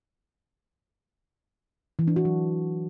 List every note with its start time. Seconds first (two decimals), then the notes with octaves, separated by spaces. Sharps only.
1.99 E3
2.08 D4
2.16 F#4
2.25 F#3